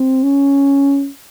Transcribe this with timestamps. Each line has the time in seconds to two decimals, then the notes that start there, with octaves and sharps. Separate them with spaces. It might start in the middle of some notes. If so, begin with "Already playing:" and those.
Already playing: C4
0.23 C#4